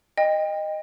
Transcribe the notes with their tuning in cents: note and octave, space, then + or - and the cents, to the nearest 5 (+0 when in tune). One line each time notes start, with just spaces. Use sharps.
D#5 -10 G5 +25